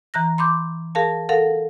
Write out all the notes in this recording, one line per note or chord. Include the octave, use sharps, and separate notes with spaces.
E3 A#5 F#6 A#6
B5 C6 D6 G6
G#4 A#4 F5 A5
A4 A#4 F5 F#5